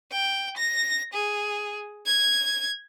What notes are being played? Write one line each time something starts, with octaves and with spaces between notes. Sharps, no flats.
G5
A#6
G#4
G#6